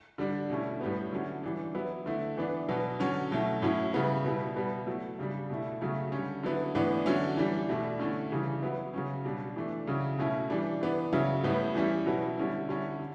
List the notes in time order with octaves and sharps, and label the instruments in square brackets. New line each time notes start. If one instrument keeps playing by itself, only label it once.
[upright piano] D3 G3 D4
B2 A3 C#4 E4
A2 G3 B3
D3 F#3 C#4 E4
E3 G3 D4
F#3 B3 E4
D3 A3 E4
E3 B3 D4
B2 F#3 B3
D3 F#3 C#4
B2 F#3 A3 E4
A2 F#3 C#4 E4
C#3 G3 B3 E4
B2 G3 B3 E4
B2 G3 B3
F#3 A3 E4
C#3 G3 D4
B2 A3 E4
C#3 F#3 A3 C#4
D3 G3 C#4
D3 F#3 B3 E4
A2 E3 B3 D4
D3 F#3 C#4 E4
E3 G3 D4
B2 A3 D4
D3 A3 C#4 E4
C#3 E3 G3 C#4
F#3 B3 E4
C#3 F#3 C#4
B2 G3 D4
E3 A3 D4
C#3 F#3 C#4 E4
B2 A3 C#4 E4
E3 G3 D4
E3 B3 D4
C#3 F#3 C#4 E4
A2 G3 B3 E4
E3 G3 C#4 E4
B2 F#3 B3 E4
D3 G3 C#4 E4
D3 G3 C#4 E4
D3